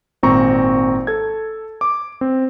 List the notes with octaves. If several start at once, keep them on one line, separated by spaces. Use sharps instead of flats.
G#1 A#2 C4 A#5 C#6
A4 G#6
D6
C4